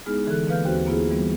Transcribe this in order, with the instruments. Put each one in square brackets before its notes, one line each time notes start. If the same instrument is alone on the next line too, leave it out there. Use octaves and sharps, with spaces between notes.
[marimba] G#3 B3 D#4 E4 G#4 F6
D3 E3 A4 F#6
E3 A#3 B4 F5 F6 G6
D#2 C4 F#4 G4 C5 F#6
A#3 B3 E4 F4 G#4
E3 G3 A#3 B3